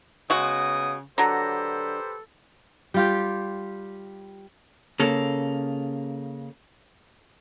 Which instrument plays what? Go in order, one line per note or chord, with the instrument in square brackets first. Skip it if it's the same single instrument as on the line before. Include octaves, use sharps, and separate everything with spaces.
[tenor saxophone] C#3 [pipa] G#3 F#4 [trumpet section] B3 D#6
[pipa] D3 F#3 [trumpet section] G4 B4 C5 [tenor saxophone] A4 [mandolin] A#5
[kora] G3 F4 G4
[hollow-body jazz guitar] C#3 A#3 A4